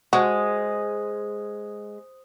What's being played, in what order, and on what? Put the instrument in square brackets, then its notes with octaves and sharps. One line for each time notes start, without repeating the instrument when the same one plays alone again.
[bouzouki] G#3 [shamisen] F#4 [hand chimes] C5 D#6